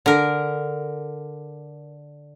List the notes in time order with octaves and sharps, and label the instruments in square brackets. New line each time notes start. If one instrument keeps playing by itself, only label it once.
[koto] D3 A#4